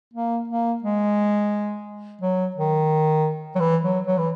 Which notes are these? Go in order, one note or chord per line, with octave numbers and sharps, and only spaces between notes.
A#3
A#3
G#3
F#3
D#3
F#3
E3
F#3
F#3
E3